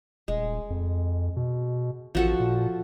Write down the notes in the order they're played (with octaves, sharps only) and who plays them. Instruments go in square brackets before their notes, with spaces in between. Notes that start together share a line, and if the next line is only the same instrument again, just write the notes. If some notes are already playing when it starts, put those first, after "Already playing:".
[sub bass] D#1 [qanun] G#3
[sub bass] F2
B2
[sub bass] A1 [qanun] F3 F#4 A4
[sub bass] A#2